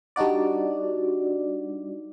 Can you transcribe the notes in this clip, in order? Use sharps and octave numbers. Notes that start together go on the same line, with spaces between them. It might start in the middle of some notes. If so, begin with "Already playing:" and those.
G3 D4 D#4 F#4 D5